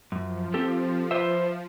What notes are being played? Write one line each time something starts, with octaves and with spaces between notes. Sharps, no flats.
F#2 F3
C4 G4 A4
B4 C5 E5